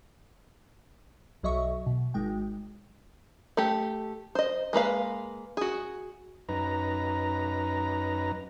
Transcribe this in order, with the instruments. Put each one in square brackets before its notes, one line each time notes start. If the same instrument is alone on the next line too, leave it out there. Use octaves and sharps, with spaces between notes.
[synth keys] B1 F#3 D#5 E5 C#6
B2
G#1 G#3 G5
[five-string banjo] A3 G4
C5 D#5
G#3 A#3 B4 F5
F#4 G#4
[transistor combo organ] F#2 D#4 B4 A#5